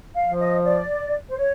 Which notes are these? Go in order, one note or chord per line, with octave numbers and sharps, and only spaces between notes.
F5
F3
D#5
D5
C5
C#5